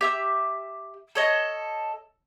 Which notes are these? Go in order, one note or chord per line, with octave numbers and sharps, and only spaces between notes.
G4 E5 E6
A4 C#5 D#5